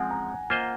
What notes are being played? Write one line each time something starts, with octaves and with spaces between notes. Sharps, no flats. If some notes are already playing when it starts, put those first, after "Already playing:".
Already playing: F3 G#3 C4 F#5 G#5
A#5
A#3 F4 C5 D#5